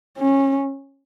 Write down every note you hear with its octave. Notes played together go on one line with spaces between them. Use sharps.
C#4